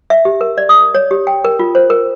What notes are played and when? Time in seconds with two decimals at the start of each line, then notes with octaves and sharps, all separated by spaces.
0.10 E5
0.25 G4
0.41 A#4
0.58 D5
0.69 D#6
0.95 C#5
1.11 G4
1.27 G5
1.45 A#4
1.59 F4
1.75 C5
1.90 A#4